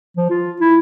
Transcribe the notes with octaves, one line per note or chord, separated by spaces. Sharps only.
F3
F4
E4